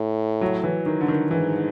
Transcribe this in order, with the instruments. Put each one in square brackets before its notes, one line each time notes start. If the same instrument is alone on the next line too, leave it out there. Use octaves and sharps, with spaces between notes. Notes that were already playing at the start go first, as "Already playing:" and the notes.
Already playing: [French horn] A2
[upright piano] F#3
E3
D#3
D3
D#3
[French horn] G#2 [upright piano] E3